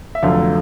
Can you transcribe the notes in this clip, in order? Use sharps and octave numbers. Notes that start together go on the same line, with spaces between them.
E5
F1 F2 D3 F#3 A3 F5